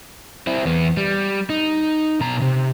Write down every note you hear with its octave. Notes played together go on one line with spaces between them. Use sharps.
C4 E4
E2 B3
G3
D#4
B2 A#5
C3